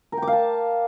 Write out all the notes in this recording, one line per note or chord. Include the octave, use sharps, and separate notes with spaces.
A#4
G5
D6
F5
A5